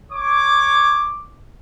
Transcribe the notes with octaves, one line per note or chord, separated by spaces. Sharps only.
C#5 D6